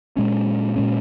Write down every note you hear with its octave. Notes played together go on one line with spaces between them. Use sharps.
A#2 G#3 C#4
A#2 G#3 C#4